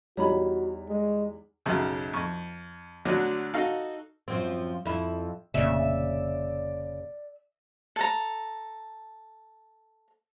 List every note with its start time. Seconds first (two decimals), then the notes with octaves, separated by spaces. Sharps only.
0.17 E2 G3 D#4 F#4 C#5 A#5 B5
0.88 G#3
1.66 B1 F#2 C#3
2.13 F2 C#6
3.05 D2 D3 F#3 D4
3.54 D#4 F#4 A4 D#5 F5
4.28 F#2 F3 C4
4.86 F2 E4
5.54 F1 A#2 C#3 D5 E5
7.96 A4 A#5